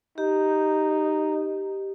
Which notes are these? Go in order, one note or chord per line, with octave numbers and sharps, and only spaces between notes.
D#4 G4